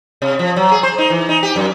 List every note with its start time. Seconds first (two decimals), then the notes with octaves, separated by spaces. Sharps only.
0.22 C3
0.39 F3
0.56 F#3
0.72 G#4
0.83 C5
0.98 D#4
1.10 E3
1.29 D#4
1.43 G4
1.56 F#2